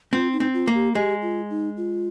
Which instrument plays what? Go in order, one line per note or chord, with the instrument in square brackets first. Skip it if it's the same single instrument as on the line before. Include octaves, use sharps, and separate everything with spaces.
[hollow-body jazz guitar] C4 [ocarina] F4
[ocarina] D#4
[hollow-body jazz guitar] C4
[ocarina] F4
[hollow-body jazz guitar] A#3
[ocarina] G4
[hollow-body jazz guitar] G#3 [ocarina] G4
[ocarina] F4
D#4
F4